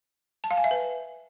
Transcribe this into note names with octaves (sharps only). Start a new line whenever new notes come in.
A5
F5
G#5
E5
B4